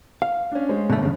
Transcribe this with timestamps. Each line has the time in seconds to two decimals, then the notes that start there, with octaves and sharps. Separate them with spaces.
0.22 F5
0.51 C#4 D4
0.69 G#3 C5 C#5
0.90 G1 B2 A3
1.02 E2 C#3